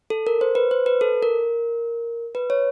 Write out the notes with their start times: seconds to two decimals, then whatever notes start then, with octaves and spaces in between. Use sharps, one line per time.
0.10 A4
0.27 A#4
0.41 C5
0.55 B4
0.71 C5
0.86 B4
1.01 A4
1.23 A#4
2.35 B4
2.50 C#5